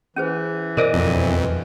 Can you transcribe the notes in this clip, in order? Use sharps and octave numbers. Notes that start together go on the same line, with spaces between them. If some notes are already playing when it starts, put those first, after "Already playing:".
E3 C#4 G#4 C5
B2 A#4 C5 D5 D#5
F2